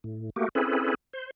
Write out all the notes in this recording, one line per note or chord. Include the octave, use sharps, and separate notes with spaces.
A2
A3 A#3 F#4 G4
C4 C#4 E4 G#4 A4 B4
C5